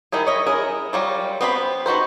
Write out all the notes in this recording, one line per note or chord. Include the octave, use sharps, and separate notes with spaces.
D#3 D#4 E4 G#4
C#5 D#5 E5
E4 G#4 A#4
F#3 G3 F4
B3 C4 C5 D5 B5
D#4 F#4 B4 C5